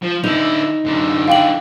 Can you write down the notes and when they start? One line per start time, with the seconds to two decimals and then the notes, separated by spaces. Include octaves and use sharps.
0.02 F3
0.24 D3 D#4 E4 F7
0.85 F#2 D3
1.28 D3 E3 F5 G5 F#7